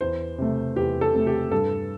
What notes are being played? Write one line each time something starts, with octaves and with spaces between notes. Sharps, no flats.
E2 C5
C3 A3
E2 G4
A4
C3 A3
G4
G2 A4